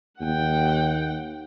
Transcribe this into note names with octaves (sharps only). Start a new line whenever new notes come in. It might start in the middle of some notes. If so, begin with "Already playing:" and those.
D#2 F#5 G5